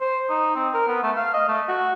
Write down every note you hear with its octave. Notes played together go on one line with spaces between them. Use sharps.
C5
D#4
C4
A#4
B3
A3
F5
D#5
A3
F#4